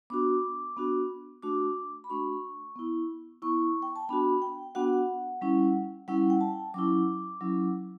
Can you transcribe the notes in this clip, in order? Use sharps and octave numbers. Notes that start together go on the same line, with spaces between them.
B3 D4 F#4 D6
B3 D4 F#4
A3 D4 F#4 D6
B5
A3 D4 F#4 C#6
B3 E4
B3 E4 C#6
G5
A5
B3 D4 F#4 B5
G5
B3 D4 F#4 F#5
G3 C#4 E4
G3 C#4 E4 F#5
G5
A5
F#3 C#4 E4 D6
F#3 C#4 E4